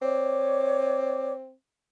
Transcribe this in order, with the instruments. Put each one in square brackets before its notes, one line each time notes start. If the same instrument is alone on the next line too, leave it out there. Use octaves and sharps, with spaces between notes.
[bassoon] C4 [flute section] C#5 D5 D6